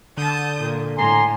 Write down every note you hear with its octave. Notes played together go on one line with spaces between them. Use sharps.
D3 A5 D#6 G6
A#2
A2 G#5 A#5 C6